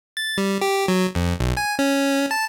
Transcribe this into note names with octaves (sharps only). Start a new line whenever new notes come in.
A6
G3
G4
F#3
F2
B1
G#5
C#4
A5